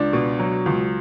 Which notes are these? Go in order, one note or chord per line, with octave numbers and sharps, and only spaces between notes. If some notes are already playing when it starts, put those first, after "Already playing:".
Already playing: C#2 D4
B2
F#3
C#2